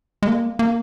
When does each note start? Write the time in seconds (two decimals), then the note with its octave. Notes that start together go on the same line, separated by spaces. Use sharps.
0.23 G#3
0.27 A#3
0.59 A#3